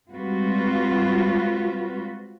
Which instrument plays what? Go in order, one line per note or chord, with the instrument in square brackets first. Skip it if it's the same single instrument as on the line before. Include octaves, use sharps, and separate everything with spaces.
[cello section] G3 G#3 C4 F4 F#4 B4